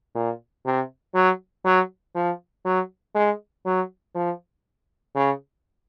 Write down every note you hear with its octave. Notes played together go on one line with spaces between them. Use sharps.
A#2
C3
F#3
F#3
F3
F#3
G#3
F#3
F3
C#3